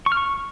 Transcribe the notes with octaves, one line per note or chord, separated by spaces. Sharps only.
C#6
F6
C#6